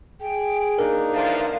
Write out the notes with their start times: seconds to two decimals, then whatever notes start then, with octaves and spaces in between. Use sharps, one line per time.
0.21 G#4 G5
0.79 A#3 D4 D#4 A#4
1.12 D3 E3 F3 F5